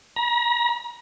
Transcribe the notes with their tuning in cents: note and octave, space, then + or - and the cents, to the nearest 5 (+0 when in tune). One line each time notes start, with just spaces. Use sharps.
A#5 +35